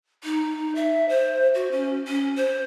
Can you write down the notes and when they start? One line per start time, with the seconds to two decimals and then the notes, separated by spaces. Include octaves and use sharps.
0.24 D#4
0.76 E5
1.09 C5
1.54 F#4
1.72 C#4
2.07 C#4
2.36 C5